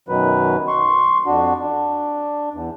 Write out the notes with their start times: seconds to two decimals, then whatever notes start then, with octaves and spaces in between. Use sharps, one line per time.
0.08 F#2 B2 D#3 F#3 B4
0.68 C6 C#6
1.26 F2 D4 F#4
1.60 D4
2.54 E2